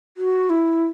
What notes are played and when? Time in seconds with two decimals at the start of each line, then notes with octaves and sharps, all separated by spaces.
0.17 F#4
0.50 E4